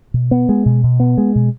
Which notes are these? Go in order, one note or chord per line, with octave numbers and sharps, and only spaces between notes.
B2
B3
G#3
B2
B2
B3
G#3
B2